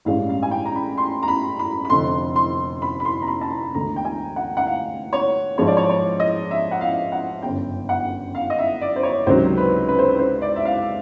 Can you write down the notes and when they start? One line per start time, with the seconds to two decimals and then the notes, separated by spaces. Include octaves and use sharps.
0.05 A1 G2 E3 G#3 C#4 F5
0.29 F5
0.43 G#5
0.51 G5
0.65 A#5
0.75 B5
0.98 C6
1.23 A#5
1.28 B5
1.59 B5
1.85 B5
1.90 F1 F2 D3 C6
2.36 C6
2.82 B5
3.00 B5
3.05 C6
3.22 A#5
3.28 B5
3.41 A5
3.51 A#5
3.74 E1 D2 D3 A#5
3.96 G5
4.05 G#5
4.36 F#5
4.57 F#5
4.67 F5
5.13 C#5
5.58 G#2 F3 G#3 C#5
5.67 D5
5.77 C#5
5.89 C#5
6.20 D#5
6.51 E5
6.71 F#5
6.81 F5
7.12 F#5
7.42 G1 F#2 C#3 G5
7.89 F#5
8.35 F5
8.50 D#5
8.58 E5
8.81 D5
8.96 C5
9.03 C#5
9.26 C#2 C3 D#3 F#3 C5
9.57 B4
9.89 B4
9.99 C5
10.09 B4
10.19 C5
10.42 D5
10.56 E5
10.65 F5